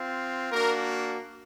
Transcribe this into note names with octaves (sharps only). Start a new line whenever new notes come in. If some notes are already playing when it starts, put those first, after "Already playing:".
Already playing: C4 F4
A#3 D4 F#4 A#4